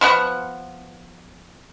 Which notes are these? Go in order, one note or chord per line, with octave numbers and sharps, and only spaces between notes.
F3 B3 F#5